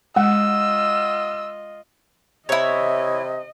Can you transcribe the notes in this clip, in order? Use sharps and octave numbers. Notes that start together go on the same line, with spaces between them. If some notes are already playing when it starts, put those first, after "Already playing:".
G#3 F4 D#5 F#5 E6
C3 E4 C#5 D#5